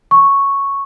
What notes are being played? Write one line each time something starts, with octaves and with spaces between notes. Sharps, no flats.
C#6